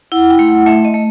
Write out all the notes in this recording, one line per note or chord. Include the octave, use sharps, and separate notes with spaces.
E4 F#5
G5
A3
F#5
A3 E5
D#5
A3